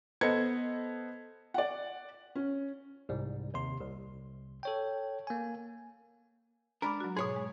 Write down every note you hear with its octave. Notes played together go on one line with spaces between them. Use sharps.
B3 A4 C5 D#5 G#6 C#7
D5 F#5
C#4
C2 G#2 G3
D#2 C3 C6
C2
A4 C#5 G5
A#3 G#5
G#3 D4 A#4 B5 D6
F#3 F#4
G#2 B2 G#4 C#5
G#3